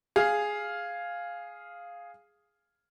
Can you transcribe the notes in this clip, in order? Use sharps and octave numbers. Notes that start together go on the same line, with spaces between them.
G#4 F5